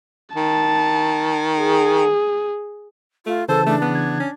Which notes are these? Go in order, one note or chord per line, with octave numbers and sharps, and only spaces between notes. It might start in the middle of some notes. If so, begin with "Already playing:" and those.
D#3 A5
G#4
A3 F4
C#3 E3 A4 C5 A5
A3 D4
B3
G#6
C#4